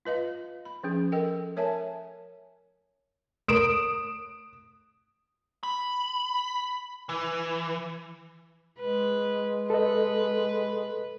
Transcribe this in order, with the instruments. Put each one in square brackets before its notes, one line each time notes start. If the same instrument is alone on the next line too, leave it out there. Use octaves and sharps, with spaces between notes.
[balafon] F4 B4 D#5 F5
B5
F3 C#4 G#4
A4 A#4 D#5 G5
A#4 C#5 E5 G#5 A5
[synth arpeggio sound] A3 A#4 [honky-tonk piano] D#6 D7 E7
[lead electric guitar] B5
E3
[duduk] G#3 [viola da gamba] B4
[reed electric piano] A4 D#5 [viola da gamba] B4